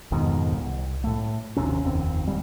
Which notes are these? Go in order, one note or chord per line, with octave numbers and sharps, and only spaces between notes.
F2 G#2 B2 D#3
C2
A2 A3
G#1 D#2 C3 C#4
F1 D#2 C4
D#1 D#2 G#2 G3